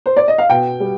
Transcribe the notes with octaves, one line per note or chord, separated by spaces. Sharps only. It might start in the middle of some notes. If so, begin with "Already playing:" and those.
C5
D5
D#5
F5
B2 G5
G3